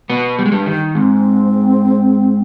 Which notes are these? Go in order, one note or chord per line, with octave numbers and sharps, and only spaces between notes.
B2 B3
G3
G#3
G2 G3
D#3
G#2 C4